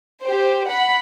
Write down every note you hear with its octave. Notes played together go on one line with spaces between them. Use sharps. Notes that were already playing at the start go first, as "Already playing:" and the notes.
G4 C5
F#5 B5